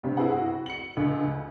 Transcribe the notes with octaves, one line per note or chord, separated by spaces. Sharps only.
G2 C3
C4 E4 G#4 B4 F#5
F#4
C#7 F#7
C#2 D3
D2